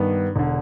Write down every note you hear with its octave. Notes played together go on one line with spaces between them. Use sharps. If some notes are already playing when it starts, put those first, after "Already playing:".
Already playing: G2 D#3 B3
E1 D3